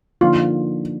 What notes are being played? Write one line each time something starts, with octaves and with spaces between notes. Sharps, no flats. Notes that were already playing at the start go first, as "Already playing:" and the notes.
D3 F3 A#3 D#4 F4